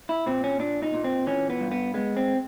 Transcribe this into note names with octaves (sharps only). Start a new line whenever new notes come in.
E4
A#2 C4
C#4
A#2 D4
D#4
A#2
C4
E3 C#4
B3
G2
B3
G#3 B3
C4